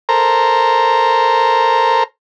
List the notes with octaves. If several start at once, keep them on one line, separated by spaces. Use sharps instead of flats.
A4 A#4 C5 A#5